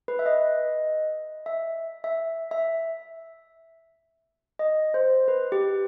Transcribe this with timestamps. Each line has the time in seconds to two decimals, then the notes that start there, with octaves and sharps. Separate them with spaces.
0.08 B4
0.19 E5
0.26 D#5
1.46 E5
2.04 E5
2.51 E5
4.59 D#5
4.94 C5
5.28 B4
5.52 G4